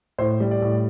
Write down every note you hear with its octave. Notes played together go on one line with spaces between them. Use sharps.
A2 C5
G3
D5
A2